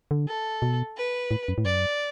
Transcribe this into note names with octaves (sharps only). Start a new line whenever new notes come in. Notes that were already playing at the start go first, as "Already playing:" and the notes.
D3
A4
B2
B4
A2
F#2
A2
F#2 D5